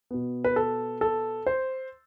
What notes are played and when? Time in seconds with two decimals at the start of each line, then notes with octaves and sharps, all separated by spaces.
0.11 B2 B3
0.44 B4
0.56 A4
1.01 A4
1.47 C5